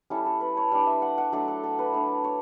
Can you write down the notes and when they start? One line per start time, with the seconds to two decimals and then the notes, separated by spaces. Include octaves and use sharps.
0.10 G3 C#4 E4 A4
0.26 A4
0.41 B4
0.57 C#5
0.72 G3 D4 D5
0.86 E5
1.02 F#5
1.18 F#5
1.32 F#3 A3 D4 A4
1.48 A4
1.64 A4
1.79 B4
1.94 A3 D4
2.24 C#5